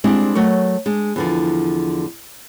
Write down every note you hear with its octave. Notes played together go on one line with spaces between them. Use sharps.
G3 G#3 C4 D4 E4
F#3 A3 A#4 C#5
G#3 D4
E2 D3 F3